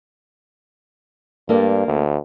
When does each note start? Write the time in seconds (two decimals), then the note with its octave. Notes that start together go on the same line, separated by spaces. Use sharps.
1.49 G2 A#3 A4 D5
1.87 D2